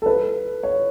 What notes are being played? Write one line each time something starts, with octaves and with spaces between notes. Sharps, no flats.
A4
B4
C#5